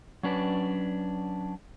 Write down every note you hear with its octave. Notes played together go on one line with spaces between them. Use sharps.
F#3 C#4 D4 B4 D5